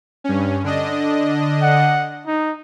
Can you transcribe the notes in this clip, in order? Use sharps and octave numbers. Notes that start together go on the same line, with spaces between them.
G2 C#4
D3 D4 D#5
F#5
D#4